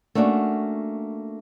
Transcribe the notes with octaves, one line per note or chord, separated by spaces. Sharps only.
A3 A#3 C#4 D4 F#4